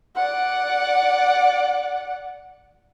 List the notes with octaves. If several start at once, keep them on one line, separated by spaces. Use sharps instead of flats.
D5 F#5